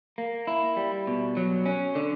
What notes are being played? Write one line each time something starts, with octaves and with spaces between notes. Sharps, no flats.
A#3
E4
G3
B2
F#3
C#4
D3